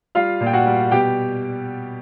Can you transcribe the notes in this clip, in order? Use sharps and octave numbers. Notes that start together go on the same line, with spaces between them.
G3 F4 F5
A#2
G5
F#4 F#5
G3
B2 G4 G5